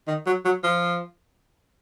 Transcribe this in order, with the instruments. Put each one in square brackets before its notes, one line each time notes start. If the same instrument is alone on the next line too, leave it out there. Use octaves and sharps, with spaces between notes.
[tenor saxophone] D#3
F#3
F#3
F3